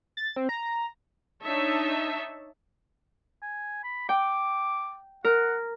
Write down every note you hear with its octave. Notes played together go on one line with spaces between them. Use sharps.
A6
C4
A#5
D4 D#4 C#5 E5 A5
G#5
B5
G5 D6
A#4 F#5